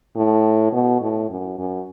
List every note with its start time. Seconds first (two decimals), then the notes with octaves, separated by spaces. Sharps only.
0.16 A2
0.73 B2
1.01 A2
1.30 F#2
1.58 F#2